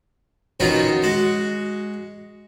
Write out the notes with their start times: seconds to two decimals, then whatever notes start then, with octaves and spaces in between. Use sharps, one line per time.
0.60 B2 D#3 F#3 C#4 D#4 F4
1.02 G#3 F#4